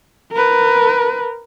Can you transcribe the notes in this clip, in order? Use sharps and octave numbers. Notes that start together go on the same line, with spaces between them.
A#4 B4